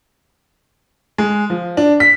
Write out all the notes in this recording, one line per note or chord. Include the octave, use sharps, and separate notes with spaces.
G#3
F3
D4
B6